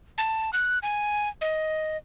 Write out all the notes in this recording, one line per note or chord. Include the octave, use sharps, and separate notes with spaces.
A5
F#6
G#5
D#5